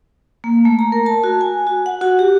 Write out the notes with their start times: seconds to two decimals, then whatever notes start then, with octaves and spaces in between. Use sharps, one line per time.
0.44 A#3
0.65 A3
0.79 A#5
0.92 A#4
1.06 A5
1.24 F#4
1.41 G#5
1.67 F#4
1.86 F#5
2.01 F#4
2.19 G4